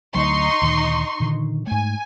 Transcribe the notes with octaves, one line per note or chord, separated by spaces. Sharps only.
D2 F#3 D#4 C6 C#6
D2 A#2 D#3
A#2 D3 D#3
G#2 A3 G#5